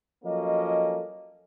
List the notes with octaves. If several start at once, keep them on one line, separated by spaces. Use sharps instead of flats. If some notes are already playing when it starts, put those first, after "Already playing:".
F3 F#3 A#3 C#4 A4 D#5